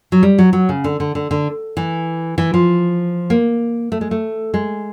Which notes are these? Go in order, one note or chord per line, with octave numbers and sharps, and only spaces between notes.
F#3
G3
F#3
F#3
C#3
D3
D3
D3
D3
E3
E3
F3
A#3
A3
G#3
A3
G#3